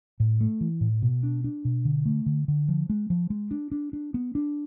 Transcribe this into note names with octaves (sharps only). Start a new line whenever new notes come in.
A2
A3
E3
A2
B2
D4
D4
B2
D3
A3
D3
D3
F3
G#3
F3
G#3
D4
D4
D4
B3
D4